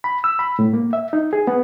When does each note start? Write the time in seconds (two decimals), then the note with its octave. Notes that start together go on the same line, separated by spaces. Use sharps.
0.04 B5
0.24 E6
0.39 B5
0.59 A2
0.73 A#3
0.93 E5
1.13 D#4
1.33 G#4
1.47 B3